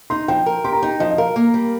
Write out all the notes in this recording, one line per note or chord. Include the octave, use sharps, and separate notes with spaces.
D#4 C6
F3 G5
A#4
G4 C6
A#5
D#4 G5
F3 D#5
D#5
A#4 F5
A#3
G3